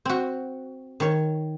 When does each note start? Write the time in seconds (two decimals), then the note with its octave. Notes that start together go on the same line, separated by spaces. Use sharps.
0.05 C4 F#4
1.00 D#3 C#5